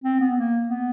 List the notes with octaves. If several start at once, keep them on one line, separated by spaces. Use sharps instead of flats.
C4
B3
A#3
B3